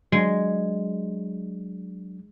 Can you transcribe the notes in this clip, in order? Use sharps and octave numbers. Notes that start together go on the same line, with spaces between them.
F#3 G#3 D4